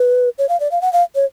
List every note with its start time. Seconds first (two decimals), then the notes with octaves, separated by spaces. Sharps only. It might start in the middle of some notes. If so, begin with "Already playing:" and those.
Already playing: B4
0.38 C#5
0.49 F5
0.60 D5
0.71 F5
0.82 F#5
0.93 F5
1.15 C#5